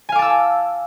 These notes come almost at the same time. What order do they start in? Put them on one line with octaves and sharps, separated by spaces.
G#5 F5 D6 A5 E6